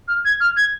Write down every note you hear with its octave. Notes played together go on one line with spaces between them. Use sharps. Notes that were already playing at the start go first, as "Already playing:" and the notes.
F6
G#6
F6
G#6